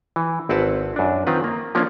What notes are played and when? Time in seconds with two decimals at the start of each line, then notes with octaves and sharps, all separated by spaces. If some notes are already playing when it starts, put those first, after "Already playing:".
0.16 E3
0.49 G#1 C4 E4 B4 F#5 A5
0.96 F#2 D4
1.27 D#3 C4 F4 B4
1.44 A#3
1.75 F3 A#3 C#4 D4 F4